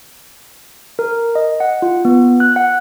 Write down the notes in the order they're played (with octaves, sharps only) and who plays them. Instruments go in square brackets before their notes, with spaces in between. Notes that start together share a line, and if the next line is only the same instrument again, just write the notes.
[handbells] A#4
D#5
F#5
F4
B3
F#6
F#5